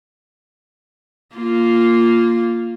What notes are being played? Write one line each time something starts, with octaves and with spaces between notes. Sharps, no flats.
A#3 F4